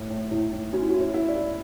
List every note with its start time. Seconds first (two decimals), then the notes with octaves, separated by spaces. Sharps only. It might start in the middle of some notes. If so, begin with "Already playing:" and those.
Already playing: A2
0.10 A2
0.31 A2 E4
0.53 A2
0.73 C#4 F#4
0.82 E4
0.89 F#4
0.94 E4
1.01 C#5
1.14 E4
1.29 D5
1.35 E4